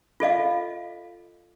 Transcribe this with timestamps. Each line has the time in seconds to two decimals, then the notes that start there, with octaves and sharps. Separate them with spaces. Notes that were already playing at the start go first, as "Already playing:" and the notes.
0.20 F4 A4 D#5 F5